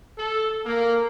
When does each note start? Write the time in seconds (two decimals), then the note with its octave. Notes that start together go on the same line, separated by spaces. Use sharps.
0.18 A4
0.66 A#3